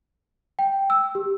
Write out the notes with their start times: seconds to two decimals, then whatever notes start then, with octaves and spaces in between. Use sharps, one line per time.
0.59 G5
0.90 E6
1.15 G4